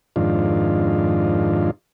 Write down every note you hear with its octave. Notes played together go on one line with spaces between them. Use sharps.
F2 G#2 D#3 D4 F4